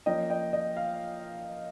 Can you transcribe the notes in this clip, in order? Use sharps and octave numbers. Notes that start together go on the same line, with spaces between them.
F3 A#3 C#4 D#5 G5
D#5 G5
D#5
F5